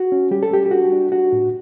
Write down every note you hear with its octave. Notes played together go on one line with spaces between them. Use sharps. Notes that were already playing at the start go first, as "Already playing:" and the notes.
Already playing: F#4
C#4
G3 G4
A4
G3 G4
G4
D4 F#4
D4
D4 F#4
A2